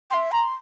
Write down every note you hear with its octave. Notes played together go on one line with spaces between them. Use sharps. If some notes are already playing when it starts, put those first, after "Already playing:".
G5 C6
E5
A#5 C6